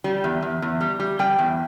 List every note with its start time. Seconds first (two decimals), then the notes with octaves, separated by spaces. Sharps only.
0.04 G3
0.24 E2
0.42 E2
0.62 E2
0.81 G3
1.00 G3
1.19 G3 G5
1.39 E2